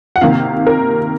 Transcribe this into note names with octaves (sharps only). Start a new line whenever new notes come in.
F#5
C3 D#3 A#3 F5
A#4